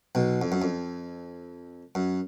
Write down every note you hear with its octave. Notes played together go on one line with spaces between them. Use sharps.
B1 B2
F2
F#2
F2
F#2